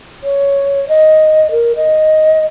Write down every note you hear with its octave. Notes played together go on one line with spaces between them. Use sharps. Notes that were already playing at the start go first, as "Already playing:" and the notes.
C#5
D#5
A#4
D#5